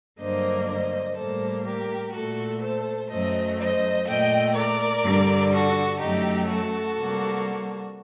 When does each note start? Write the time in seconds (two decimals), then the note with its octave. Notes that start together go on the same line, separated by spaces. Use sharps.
0.19 G2 D3 F#3 A#3 C5 D#5
0.67 C5 D#5
1.15 A2 G3 A#3 A4 C5
1.64 G4 A#4
2.12 A#2 A3 F#4 A4
2.61 A4 C5
3.09 F#2 F#3 A3 C5 D#5
3.58 C5 D#5
4.07 A#2 A3 D#5 G5
4.55 A#4 D5
5.03 G2 D3 G3
5.52 F#4 A4
6.00 F#2 F#3 A3 D#4 G4
6.48 F#4 A4
6.97 C3 G3 A#3